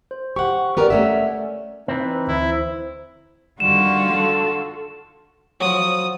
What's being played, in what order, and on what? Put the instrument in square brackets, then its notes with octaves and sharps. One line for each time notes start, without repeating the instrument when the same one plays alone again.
[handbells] C5
[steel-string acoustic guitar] G4 F#5 [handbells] C#6
[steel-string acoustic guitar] B3 G4 A#4 [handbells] D5 F#5
[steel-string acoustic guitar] A3 C#4 E5
[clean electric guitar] E3 C4 [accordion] D#4 B4
[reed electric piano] D2 C5 [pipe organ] E4
[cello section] F2 D#3 G3 [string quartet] D3 F4 F#4 [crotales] E7
[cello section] A4
[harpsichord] F3 F#3 [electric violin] D#6